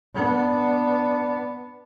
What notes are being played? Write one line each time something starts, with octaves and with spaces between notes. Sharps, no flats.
B3 D4